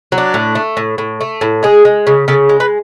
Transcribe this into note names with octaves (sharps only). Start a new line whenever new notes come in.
F#3
D4
A2
A3
A2
A2
A3
A2
G#3 G#4
G#3
C#3
C#3 A4
G#3
B4